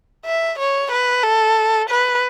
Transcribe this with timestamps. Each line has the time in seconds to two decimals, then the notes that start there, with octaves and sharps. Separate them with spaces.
0.25 E5
0.59 C#5
0.91 B4
1.23 A4
1.89 B4